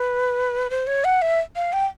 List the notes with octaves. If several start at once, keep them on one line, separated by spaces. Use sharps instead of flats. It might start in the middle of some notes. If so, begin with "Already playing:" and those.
Already playing: B4
C5
C#5
F#5
E5
F5
G5